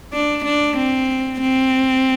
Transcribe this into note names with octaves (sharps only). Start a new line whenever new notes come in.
D4
D4
C4
C4